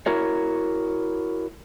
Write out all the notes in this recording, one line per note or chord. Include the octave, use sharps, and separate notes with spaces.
E4 F#4 A#4 C#5